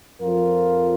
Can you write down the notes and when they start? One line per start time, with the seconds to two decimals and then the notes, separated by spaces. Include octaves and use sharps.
0.22 F2 F3 F4 A#4